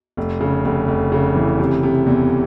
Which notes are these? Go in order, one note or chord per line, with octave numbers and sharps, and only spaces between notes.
F1
C#3
F1
F1
C#3
E3
C3
C3
E2